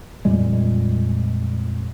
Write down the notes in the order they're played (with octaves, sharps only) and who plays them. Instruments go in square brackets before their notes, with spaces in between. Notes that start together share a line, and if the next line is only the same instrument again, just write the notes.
[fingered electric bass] F2 A#2 G3 G#3